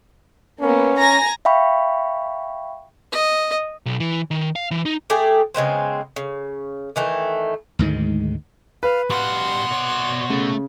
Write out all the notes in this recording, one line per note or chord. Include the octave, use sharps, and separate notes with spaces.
A#3 B3 C#4
G#5 A#5 A#6
E5 F5 G5 B5 C#6
D#5
B1
E3
D#3
F5
E3
D#4
A3 G4 G#4
C#3 G#3 B3 C4
C#3
D#3 E3 A3
D2 G#2 D#3 G#3
B4 F5
B2 G3 F5 F#5 C6
C#5 D5
C#3 A3